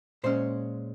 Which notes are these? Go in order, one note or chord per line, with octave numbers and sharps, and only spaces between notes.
A#2 G#3 C#4 C5